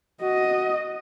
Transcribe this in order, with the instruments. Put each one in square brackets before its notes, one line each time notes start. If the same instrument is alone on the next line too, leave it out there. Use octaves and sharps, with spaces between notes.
[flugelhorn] F#4 [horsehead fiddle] D#5